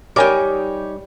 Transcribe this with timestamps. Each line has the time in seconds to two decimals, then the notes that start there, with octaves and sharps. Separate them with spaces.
0.16 G3 D#4 G4 A#4 C#5 G#5 D6